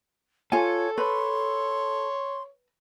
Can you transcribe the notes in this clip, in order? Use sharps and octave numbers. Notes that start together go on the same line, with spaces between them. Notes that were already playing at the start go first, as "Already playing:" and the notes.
F4 A4 C#5 G#5
B4 C#5 C6